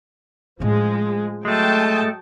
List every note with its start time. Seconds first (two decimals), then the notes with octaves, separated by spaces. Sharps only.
0.60 A2 F3 G#3 C#4
1.45 F#3 G#3 A3 G5 A5